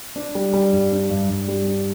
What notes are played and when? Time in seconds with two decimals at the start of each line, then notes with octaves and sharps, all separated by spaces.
0.16 D4
0.35 G3
0.54 G3
0.73 G2
0.92 D4
1.10 G2
1.30 G2
1.48 G3
1.67 D4